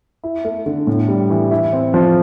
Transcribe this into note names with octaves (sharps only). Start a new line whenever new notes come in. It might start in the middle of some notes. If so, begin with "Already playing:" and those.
E4
A3
D3
A2
G3
E3
E4
C4
F3